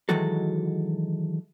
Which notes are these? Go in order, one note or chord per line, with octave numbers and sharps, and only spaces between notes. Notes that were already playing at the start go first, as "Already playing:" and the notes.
D#3 E3 F#3 G#3 F#4 A4